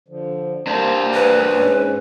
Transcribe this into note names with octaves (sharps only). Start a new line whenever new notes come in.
D3 F3
G3 A#3 D4 C5
B4
G#2 C#4